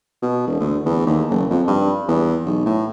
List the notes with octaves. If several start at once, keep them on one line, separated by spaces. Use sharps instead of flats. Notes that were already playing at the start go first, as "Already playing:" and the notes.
B2
E1
D2
E2
D#2
F#1
F2
G2
E2
B1
A2